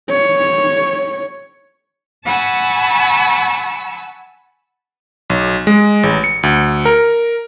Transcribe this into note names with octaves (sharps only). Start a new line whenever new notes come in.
C#5
F#5 G#5 A5 B5 C#6 E6
B1
G#3
A1
C#7
D2
A#4